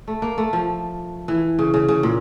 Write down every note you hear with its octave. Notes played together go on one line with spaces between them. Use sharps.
A3
A#3
A3
F3
E3
C#3
C#3
C#3
A#2